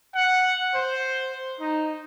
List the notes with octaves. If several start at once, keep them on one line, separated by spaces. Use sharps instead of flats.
F#5
C5
D#4